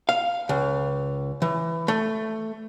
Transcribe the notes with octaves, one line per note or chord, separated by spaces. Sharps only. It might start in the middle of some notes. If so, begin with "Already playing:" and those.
F5
C#2
E3
A3